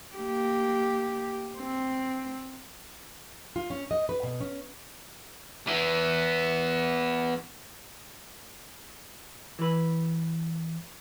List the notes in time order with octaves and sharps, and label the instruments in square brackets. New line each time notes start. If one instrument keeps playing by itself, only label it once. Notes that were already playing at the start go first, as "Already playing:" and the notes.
[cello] A#3 G4
C4
[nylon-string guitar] F4
C#4
D#5
B4
B2
C#4
[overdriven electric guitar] E3 B3
[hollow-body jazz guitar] E3 B4